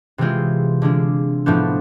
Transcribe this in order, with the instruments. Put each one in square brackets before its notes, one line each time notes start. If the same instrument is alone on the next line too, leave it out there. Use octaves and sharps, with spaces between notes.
[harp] C3 E3 G#3 C4 F4
D3 G#3 D4 F4
A2 F3 B3 D4